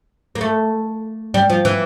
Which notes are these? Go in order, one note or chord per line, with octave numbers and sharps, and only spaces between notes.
A#3
A3
G3
F3
E3